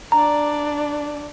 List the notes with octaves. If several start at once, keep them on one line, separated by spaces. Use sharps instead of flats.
D4 D5 A#5